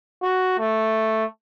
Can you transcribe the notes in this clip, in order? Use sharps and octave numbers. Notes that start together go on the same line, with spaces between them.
F#4
A3